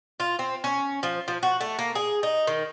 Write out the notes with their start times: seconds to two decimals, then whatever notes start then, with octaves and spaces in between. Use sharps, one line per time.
0.20 F4
0.39 C4
0.64 C#4
1.03 F3
1.28 F3
1.43 F#4
1.61 A3
1.79 A#3
1.95 G#4
2.23 D#4
2.47 D#3